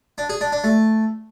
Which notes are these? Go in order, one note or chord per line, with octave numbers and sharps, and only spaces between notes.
D4
G#4
D4
D4
A3